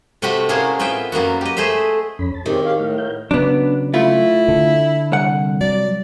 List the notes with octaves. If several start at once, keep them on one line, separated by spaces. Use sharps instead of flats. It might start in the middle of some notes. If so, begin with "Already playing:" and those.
C3 A3 C4 F#4 B5
A2 A#3 C#4 G#4 A5 C6
B3 C4 F4 E5 G5
F#2 A#3 B3 F#4
G4 D#5
A3 G#4 C5 D#5 E5
F2 C#4 B5
A5
D#3 C4 G4 G#4 C#5
G4 F5
A2 A3 F5
A#4 F5 G6
C#3 F#3 B3 D4
A3 E4 F4
D3
C2 F#5
F#3 D5